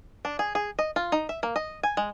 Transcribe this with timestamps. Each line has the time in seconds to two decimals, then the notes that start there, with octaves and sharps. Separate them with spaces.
0.25 D4
0.39 G#4
0.55 G#4
0.79 D#5
0.96 F4
1.12 D#4
1.29 E5
1.43 A#3
1.56 D#5
1.83 G#5
1.97 G#3